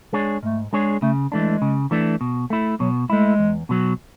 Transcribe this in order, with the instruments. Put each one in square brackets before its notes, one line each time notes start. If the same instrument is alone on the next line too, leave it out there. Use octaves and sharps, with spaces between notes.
[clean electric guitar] G#3 D4 G#4 C#5
[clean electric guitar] G#2 [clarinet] A3
[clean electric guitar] G#3 D4 G#4 C#5
[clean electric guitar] C#3 [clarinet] A3
[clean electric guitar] E3 A3 D4 [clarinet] G#3
[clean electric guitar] C#3
E3 A3 D4
B2
A3 E4
[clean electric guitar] B2 [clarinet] F#3
[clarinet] G#3 [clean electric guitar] A3 E4
[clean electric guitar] E2
B2 F#3